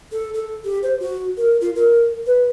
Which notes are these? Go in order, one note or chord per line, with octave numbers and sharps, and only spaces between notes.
A4
A4
G4
C5
F#4
A#4
F4
A#4
B4